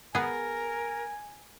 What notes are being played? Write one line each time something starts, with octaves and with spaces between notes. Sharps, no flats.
B3 G#4 A#4 G#5